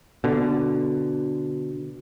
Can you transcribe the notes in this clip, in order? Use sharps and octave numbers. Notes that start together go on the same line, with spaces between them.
B2 D3